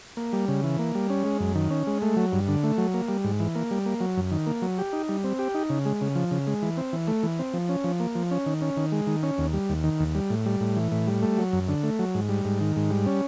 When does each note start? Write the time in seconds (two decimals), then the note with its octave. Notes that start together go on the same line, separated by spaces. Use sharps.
0.17 A#3
0.33 G3
0.48 C#3
0.64 E3
0.79 A#3
0.95 G3
1.10 C#4
1.25 G#3
1.40 F#2
1.55 D#3
1.70 C#4
1.87 G#3
2.02 A3
2.17 F#3
2.33 G2
2.48 D3
2.63 A3
2.78 F#3
2.94 A#3
3.08 G3
3.24 G#2
3.40 E3
3.55 A#3
3.71 G3
3.86 A#3
4.00 F#3
4.17 F#2
4.31 D#3
4.47 A#3
4.62 F#3
4.78 G4
4.93 D#4
5.09 G3
5.24 C4
5.39 G4
5.54 D#4
5.70 C#3
5.85 G#3
6.01 C#3
6.15 F3
6.31 C#3
6.47 G#3
6.62 E3
6.77 C4
6.93 E3
7.08 A3
7.23 E3
7.39 C4
7.54 F3
7.69 C#4
7.84 F3
8.00 A#3
8.15 F3
8.31 C#4
8.46 D#3
8.62 C#4
8.77 D#3
8.92 G#3
9.07 D#3
9.23 C#4
9.38 D#2
9.53 G3
9.69 D#2
9.84 D#3
10.00 D#2
10.15 G3
10.30 A2
10.46 G3
10.60 A2
10.76 E3
10.92 A2
11.07 G3
11.22 A3
11.38 F#3
11.53 F#2
11.68 D3
11.83 A3
11.99 F#3
12.14 G#2
12.29 G3
12.45 G#2
12.61 D#3
12.76 G#2
12.91 G3
13.06 C#4